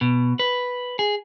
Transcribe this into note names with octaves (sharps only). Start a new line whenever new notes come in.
B2
B4
G#4